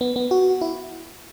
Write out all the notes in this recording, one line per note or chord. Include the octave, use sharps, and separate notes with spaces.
B3
B3
F#4
E4